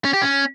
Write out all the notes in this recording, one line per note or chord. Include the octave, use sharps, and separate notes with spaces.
C#4
G4
C#4